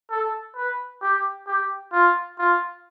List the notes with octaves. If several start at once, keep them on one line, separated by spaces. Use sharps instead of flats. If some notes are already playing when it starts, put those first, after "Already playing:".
A4
B4
G4
G4
F4
F4